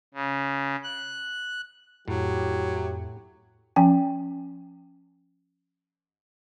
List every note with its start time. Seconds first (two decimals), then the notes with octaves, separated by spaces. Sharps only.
0.14 C#3
0.84 F#6
2.08 F2 A2 F#3 E4 G4
3.76 F3 C#4 G5 G#5